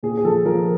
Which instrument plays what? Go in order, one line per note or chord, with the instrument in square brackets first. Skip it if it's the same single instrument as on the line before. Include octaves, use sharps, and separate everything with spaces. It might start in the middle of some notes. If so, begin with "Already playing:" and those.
[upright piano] A#2 G#4
G#4
F3 A4
F3 A#4